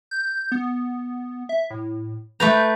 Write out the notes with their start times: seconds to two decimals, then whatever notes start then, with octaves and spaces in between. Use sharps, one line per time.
0.11 G6
0.52 B3
1.49 E5
1.70 A2
2.40 A3 B4 A#5 G6